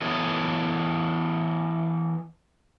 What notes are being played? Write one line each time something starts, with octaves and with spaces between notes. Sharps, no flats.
E3 B3 A4 C#5 D#5